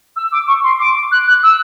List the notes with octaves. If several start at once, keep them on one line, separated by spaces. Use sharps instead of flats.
E6
D6
C#6
C6
D6
F#6
F#6
E6